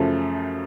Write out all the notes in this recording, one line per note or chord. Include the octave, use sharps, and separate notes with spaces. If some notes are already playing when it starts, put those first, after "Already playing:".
Already playing: F#2 C#3 F3 A3